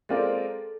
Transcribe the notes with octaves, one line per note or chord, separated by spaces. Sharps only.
G#3 C4 F4 A4 A#4 D5